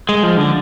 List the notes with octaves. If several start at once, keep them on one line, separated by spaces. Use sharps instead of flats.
G#3
F3
D3